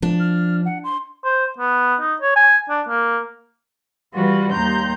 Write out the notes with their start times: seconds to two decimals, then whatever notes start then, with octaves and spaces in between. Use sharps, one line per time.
0.02 F3 D4
0.20 F6
0.65 F#5
0.84 C6
1.25 C5
1.58 B3
2.00 D#4
2.21 C#5
2.36 G#5
2.69 D4
2.88 A#3
4.13 E3 G3 F4 F#4 B4
4.51 D#2 G3 A#5 C6 G6